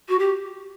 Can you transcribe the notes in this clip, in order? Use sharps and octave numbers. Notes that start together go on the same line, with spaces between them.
F#4
G4